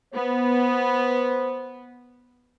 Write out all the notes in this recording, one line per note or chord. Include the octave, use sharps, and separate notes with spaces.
B3 C5